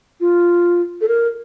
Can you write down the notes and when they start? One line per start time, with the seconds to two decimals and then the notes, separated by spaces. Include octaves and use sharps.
0.20 F4
1.01 A4
1.08 A#4